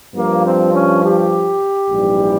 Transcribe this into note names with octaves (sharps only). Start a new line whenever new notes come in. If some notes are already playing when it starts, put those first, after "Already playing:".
G2 F3 A#3
C4
C#4
G4
A#1 G#2 E3 G3